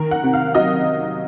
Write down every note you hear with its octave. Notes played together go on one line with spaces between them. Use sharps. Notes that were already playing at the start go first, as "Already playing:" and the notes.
Already playing: D#3 A#4
F#5
C3
F5
F#3 D#5